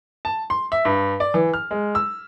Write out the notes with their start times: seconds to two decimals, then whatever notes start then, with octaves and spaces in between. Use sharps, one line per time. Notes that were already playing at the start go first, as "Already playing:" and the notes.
0.25 A5
0.50 C6
0.72 E5
0.85 G2
1.20 D5
1.34 E3
1.54 F6
1.71 G#3
1.95 E6